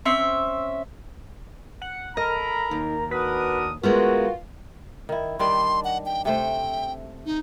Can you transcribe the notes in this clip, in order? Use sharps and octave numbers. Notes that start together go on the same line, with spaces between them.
C4 C#4 E5
F#5
A4 A#4 D#5 A#5 B5
D#2 D#4
D4 F#4 A#4 B4 D#6
G#3 A3 B3 F4 F#4 A#4
D#3 E4
D#3 G3 D4 C6
F#5
G5
C3 A3 C5 G5
D#4